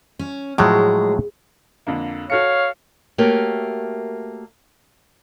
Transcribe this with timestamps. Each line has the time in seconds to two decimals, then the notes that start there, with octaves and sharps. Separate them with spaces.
0.19 C#4
0.58 A2 F3 F#3 G#3
1.87 F2 D3 A#3
2.30 F#4 A4 C#5 F5 C#7
3.18 A3 A#3 F#4 G4 A#4 C#5